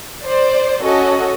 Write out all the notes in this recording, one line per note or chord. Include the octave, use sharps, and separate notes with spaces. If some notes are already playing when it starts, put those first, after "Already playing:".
C5 D5
C#4 F#4 A4 D#5